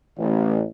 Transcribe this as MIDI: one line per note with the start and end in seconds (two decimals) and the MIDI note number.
0.18 0.63 33